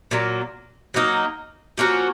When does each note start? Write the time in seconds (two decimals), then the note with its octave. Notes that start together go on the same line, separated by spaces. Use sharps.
0.11 A#2 F#3 A#3
0.94 F#3 A#3 D#4
1.78 F3 A#3 C#4 F#4